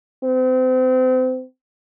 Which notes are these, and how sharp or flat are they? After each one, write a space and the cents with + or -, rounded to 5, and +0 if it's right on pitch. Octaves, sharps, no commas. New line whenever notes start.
C4 -35